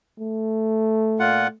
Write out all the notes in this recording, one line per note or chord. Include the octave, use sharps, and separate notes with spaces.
A3
A#2 F4 F#5